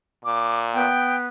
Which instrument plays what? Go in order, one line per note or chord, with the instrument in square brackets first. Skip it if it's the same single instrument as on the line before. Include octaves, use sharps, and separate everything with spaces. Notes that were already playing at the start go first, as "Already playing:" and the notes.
[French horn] A#2 [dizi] D6
[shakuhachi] B3 [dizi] G5